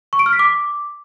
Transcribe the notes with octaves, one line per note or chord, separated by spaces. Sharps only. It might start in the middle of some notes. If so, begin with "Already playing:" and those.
C#6
D7
F6
B6
D6